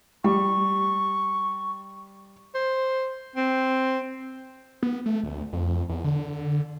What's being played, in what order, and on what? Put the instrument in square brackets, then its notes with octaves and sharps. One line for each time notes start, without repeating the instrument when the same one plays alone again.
[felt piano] G3 [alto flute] C#6
[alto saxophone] C5
C4
[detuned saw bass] B3
A3
D2
F2
E2
D3